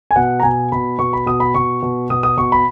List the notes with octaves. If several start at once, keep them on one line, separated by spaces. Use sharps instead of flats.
G#5
B2 F#5
A#5
B2 G#5
B2 B5
B2 C#6
B5
B2 D#6
B5
B2 C#6
B2
B2 D#6
D#6
B2 C#6
B5